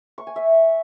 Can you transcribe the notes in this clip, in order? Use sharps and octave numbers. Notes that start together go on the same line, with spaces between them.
C#6
G#5
E5